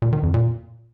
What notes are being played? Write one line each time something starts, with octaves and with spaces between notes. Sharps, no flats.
A#2
D#3
F2
A#2